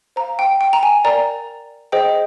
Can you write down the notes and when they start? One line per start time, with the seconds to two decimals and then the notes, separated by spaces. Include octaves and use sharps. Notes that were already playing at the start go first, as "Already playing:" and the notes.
0.16 C5 F5 A#5
0.39 G5
0.61 G5
0.73 A#5
0.83 G#5
1.05 A#4 D5 G5 A#5
1.92 G#4 C5 D#5 G5